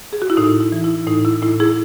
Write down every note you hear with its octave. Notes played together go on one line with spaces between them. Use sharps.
G#4
F#4
E4
A2 D#4
E4
E3
E4
A2 D#4
E4
A2 E4
E4 G#4